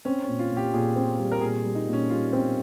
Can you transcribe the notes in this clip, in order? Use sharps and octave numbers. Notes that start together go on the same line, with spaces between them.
C4 C#4
A#2 C#4
F4
A#2
G4
A#2 G#4
C4
G3
A#4
A#2 G#4
G3
D#4
A#2
C#4
G3 F4
C4